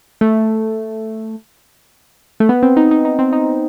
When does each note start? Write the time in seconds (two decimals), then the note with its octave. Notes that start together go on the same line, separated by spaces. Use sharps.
0.21 A3
2.40 A3
2.49 B3
2.63 C4
2.77 D#4
2.91 D#4
3.05 D#4
3.19 C4
3.33 D#4